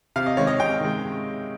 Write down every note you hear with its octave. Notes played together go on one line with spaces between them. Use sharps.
C3 F5
D#5
D#3 G#3 C#5
D#5
C3 G5
D#3 G#3